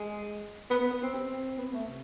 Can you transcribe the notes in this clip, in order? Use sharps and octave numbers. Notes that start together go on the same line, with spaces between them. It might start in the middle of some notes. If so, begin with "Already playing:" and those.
Already playing: G#3
B3
B3
B3
C4
C4
B3
A3
C3